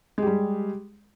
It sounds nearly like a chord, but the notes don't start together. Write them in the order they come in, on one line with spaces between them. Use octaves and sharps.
G#3 G4 G3